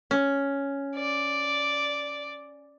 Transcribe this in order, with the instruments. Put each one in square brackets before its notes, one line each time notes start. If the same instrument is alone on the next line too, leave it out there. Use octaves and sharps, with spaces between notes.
[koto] C#4
[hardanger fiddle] D5